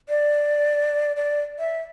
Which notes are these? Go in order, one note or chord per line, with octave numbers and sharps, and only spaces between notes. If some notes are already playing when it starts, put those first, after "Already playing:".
D5
D5
E5